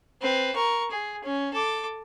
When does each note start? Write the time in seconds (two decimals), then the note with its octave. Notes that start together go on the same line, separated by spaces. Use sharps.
0.21 C4 B4
0.55 A#4 C#6
0.91 G#4
1.24 C#4
1.53 A4 D6